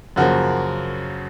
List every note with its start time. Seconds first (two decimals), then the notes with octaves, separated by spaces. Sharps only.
0.16 F#2 C#3 F3 A#3 F#4